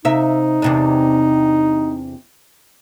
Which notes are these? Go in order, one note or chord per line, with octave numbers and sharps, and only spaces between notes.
C3 D#4 E5
E2 C3 D4